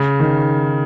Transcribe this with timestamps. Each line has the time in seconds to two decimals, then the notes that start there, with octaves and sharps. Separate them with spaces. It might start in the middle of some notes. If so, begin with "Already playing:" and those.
Already playing: C#3
0.20 D#3